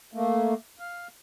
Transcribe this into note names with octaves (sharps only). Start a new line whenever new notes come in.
A3 A#3
F5